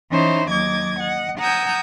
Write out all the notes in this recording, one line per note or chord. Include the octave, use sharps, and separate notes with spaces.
E3 C#4 D#4 E4 C5
D#2 F#3 D#5 D6 G#6 A6
D#5 F#5
F#5 G#5 A#5 D#6 E6 G6